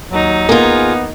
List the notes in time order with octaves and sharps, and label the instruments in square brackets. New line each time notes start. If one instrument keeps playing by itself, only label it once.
[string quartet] D#2 D#4 [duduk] F#3
[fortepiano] A#3 [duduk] B3 [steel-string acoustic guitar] F4 G#4